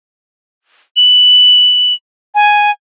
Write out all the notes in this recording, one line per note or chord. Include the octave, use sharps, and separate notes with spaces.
F#7
G#5